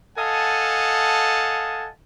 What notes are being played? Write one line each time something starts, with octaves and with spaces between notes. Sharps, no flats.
A4 D#5 F5 F#5 G#5 A5